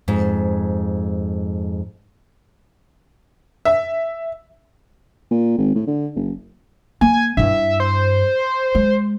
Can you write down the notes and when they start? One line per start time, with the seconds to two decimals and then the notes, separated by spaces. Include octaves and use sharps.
0.08 F2 G#2
3.65 E5
5.31 A#2
5.58 G#1
5.75 A2
5.87 D3
6.15 F#1
7.01 A#3 G#5
7.37 G2 E4 E5
7.80 C5
8.75 G#3